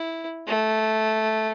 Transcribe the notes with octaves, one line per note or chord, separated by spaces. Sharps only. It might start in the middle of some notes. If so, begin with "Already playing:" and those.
Already playing: E4
A3